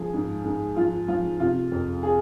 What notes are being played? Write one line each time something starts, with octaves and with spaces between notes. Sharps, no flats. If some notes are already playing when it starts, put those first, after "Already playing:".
Already playing: F3 G#4
G#2
G#2
F3 F4
F3 F4
C3 F4
F2
G#4